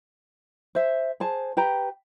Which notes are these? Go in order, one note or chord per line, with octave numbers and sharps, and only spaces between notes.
C5 E5
G#4 C5 A5
G4 B4 G5 A#5